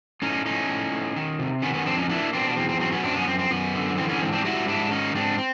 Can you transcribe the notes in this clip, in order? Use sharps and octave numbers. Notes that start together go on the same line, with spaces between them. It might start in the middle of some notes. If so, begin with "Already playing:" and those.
A2 C#4 D#4
A2 C#4 D#4
A2
A2
D#3
C3
D#3 B3 C#4
B3 C#4
F2 C4 D4
C#4 D#4
A#3 D4 E4
B2 C4 D4
B3
E2 C4
C4
F#3 C4
B3 C#4
F#2 C4 D4
B3 C#4
F#2 C4
C4
F#2 B3
D3
E3 C4
B3 C#4
G#2 C4
C4 D4
G3 E4 F#4
G#2 D4 E4
D#3 C#4 D#4
G#2 C4 D4
C4